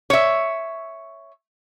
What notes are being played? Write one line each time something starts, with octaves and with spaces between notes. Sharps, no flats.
C#5 E5